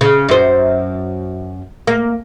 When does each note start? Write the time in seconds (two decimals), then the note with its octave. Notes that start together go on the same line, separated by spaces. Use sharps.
0.01 C#3
0.29 F#2 C5
1.87 A#3